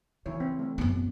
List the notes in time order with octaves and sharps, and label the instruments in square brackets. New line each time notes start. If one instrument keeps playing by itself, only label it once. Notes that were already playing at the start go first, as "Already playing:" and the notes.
[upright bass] C#3 [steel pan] E3 E4 C#5
[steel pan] C4
A3 C4
[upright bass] F#2 B3